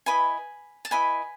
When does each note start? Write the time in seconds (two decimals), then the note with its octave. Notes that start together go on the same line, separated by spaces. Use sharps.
0.06 E4 B4 D#5 G#5 B5
0.85 A5
0.91 E4 B4 D#5 G#5 B5